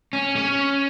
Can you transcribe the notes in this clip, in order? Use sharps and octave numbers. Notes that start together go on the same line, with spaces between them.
C#4
C#4